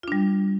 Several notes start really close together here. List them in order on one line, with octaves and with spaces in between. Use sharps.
F4 D4 G3